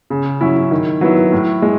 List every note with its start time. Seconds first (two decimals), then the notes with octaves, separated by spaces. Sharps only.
0.10 C#3
0.41 F#3 C#4 E4
0.71 D#3
1.01 F#3 B3 E4
1.32 A2
1.62 G#3